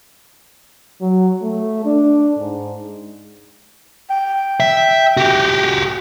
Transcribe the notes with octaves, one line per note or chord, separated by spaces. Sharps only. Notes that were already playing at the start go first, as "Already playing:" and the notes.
F#3
A3
D4
G#2
G5
E5
F#4 G4